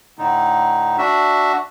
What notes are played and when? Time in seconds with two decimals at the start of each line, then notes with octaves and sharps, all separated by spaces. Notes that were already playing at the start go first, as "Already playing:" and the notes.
0.18 A2 D3 D#4
0.98 D4 F#4 E5